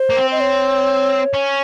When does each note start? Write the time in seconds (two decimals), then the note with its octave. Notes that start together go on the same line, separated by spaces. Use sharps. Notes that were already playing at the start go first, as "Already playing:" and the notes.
Already playing: C5
0.10 A#3
0.17 C4
0.32 D#5
0.40 C#5
1.34 C#4